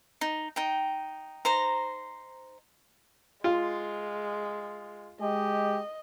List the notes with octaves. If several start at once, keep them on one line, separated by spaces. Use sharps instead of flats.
D#4
D#4 G5
D#4 C5 A#5
G#3 F4
G#3 G4 D#5